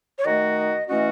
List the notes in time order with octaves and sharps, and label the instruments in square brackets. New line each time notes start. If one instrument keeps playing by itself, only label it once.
[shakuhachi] C#5
[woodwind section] D#3 A3 D#4 F#4 [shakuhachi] D#5
[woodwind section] E3 A3 C#4 F#4 [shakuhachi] D#5